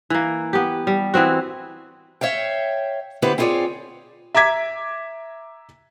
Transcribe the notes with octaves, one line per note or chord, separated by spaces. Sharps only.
E3 A#3
B3 G4
G3
E3 B3 C4 F#4
C#5 E5 F5 G5
D3 B3 C4 E4 G4 B4
C4 E4 F4 G#4 C#5 D5
E5 A#5 D6 G#6 B6